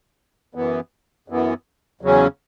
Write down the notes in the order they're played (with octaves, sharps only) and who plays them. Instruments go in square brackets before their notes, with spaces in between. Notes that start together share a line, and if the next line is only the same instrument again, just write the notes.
[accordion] F#2 E3 B3
F#2 E3 B3
E2 C#3 F#3 C#4